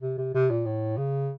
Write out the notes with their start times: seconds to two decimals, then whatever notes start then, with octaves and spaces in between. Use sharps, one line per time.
0.02 C3
0.18 C3
0.34 C3
0.51 A#2
0.66 A2
0.98 C#3